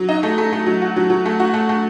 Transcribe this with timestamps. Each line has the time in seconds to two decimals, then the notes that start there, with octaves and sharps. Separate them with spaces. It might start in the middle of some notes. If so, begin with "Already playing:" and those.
Already playing: F#3
0.09 D#4
0.23 A3
0.38 A3
0.53 A3
0.67 F#3
0.82 F#4
0.96 F#3
1.10 F#3
1.26 A3
1.40 F#4
1.54 A3
1.69 A3